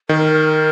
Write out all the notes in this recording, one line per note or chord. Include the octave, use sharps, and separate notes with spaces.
D#3 A#4